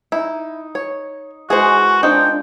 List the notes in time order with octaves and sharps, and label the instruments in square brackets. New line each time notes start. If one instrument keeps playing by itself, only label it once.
[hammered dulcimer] D#4 [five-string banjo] E4
[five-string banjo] C#5
[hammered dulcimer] E3 G#3 A#4 [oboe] F#4 [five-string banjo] G#4 C5
[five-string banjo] C4 D#4 [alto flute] D4 [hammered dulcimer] F4 [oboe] G5